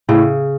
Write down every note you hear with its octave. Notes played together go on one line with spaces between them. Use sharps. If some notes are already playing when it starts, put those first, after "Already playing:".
A2 C#3